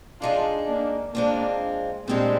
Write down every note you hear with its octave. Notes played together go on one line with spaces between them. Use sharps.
G#3 D4 D#4 F4 G#4
A#3 D4
G#3 A#3 C4 D4 F4
A#2 G3 G#3 C4 D4 G4